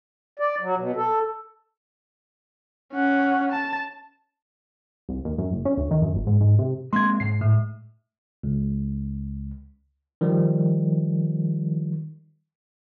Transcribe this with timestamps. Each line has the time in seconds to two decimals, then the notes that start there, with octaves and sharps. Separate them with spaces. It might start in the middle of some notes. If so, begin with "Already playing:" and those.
0.39 D5
0.61 F#3
0.77 B2
0.96 A4
2.93 C#4 F#5
3.52 A5
5.09 C2
5.25 D#2
5.38 F#2
5.52 F#1
5.65 C#4
5.77 D2
5.91 D#3
6.02 F#2
6.15 G1
6.27 G#2
6.41 G#2
6.59 C3
6.93 G#3 A#3 C4 C6 G#6
7.20 G#2 C7
7.41 A2
8.44 C#2
10.21 D#3 F3 G3